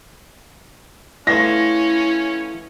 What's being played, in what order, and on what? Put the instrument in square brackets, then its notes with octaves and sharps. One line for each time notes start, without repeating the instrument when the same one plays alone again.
[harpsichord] A3 B3 F4 [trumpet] C#4 [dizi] E4 [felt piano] A#6